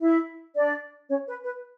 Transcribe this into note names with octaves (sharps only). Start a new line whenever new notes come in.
E4 E5
D4 D5
C#4 C#5
B4
B4